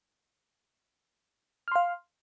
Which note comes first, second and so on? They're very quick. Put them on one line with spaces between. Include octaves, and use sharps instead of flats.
F6 C6 F5